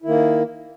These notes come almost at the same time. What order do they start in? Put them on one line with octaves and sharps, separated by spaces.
E4 D#3 A#3